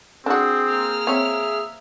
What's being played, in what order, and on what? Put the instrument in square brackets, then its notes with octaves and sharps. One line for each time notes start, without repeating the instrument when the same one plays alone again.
[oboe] C4 [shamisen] D4 F#4 [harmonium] G#4
[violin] A#3 F6
[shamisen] C4 C#5 [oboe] E5